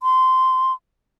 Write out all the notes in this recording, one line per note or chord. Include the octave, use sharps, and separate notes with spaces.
C6